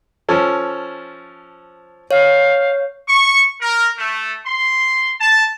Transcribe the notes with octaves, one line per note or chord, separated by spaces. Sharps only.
F3 C#4 A4
C#5 F5
C#6
A#4
A3
C6
A5